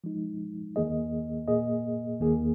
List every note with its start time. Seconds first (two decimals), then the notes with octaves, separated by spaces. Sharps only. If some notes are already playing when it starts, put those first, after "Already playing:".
0.04 F3 G#3 D#4
0.76 D#2 D#3 A#3 G#4 D#5
1.48 A#2 A#3 G#4 D#5
2.20 D#2 D#3 A#3 G#4